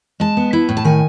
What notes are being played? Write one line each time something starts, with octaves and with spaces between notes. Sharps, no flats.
G#3 A5
B3
E4
A2
A5
D#3 G#5